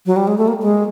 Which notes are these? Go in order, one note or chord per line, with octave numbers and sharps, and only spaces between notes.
F#3
G3
G#3
A3
A#3
G#3